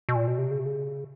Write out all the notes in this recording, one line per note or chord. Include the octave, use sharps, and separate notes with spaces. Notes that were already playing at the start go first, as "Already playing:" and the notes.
B2
A#2
B2
C3
C#3
C3
C#3